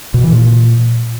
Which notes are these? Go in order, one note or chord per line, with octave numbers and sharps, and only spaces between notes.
B2
E3
A#2